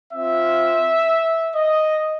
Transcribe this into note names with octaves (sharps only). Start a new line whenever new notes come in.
C4 F4 E5
D#5